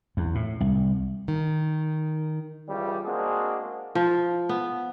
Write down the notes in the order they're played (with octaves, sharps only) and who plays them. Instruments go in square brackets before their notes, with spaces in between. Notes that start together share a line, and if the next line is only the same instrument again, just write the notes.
[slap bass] E2
A2
C2
[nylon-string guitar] D#3
[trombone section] C#2 E3 G3
G#3 A#3 C4 D4 F#4 G#4
[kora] F3
B3